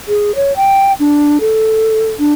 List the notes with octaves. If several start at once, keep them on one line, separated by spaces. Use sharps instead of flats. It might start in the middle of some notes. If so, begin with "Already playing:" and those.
G#4
C#5
G5
D4
A4
D4